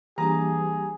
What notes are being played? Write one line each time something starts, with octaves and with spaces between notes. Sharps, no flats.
E3 G3 A#3 D4 G4 G#4 A#5